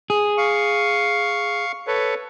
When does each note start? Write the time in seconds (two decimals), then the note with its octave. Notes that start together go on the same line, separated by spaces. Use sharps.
0.10 G#4
0.38 F5 C#6
1.87 A4 B4 C#5